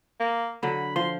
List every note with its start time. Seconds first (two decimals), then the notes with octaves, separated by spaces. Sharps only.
0.20 A#3
0.63 D3 F#3 B5
0.96 F3 C6